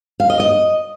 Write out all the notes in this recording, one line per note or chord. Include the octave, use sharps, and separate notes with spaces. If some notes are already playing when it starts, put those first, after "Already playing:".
F5
D#5
D#5